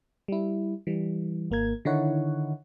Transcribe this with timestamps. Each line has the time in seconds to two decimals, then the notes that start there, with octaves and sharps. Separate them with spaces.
0.28 G3 E4
0.87 E3 G3
1.51 G#1 A#3 A#4 G#6
1.85 D3 D#3 D#4 E4 C#5 F#5